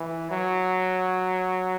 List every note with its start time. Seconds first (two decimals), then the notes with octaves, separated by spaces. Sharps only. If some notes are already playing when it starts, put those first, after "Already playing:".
Already playing: E3
0.31 F#3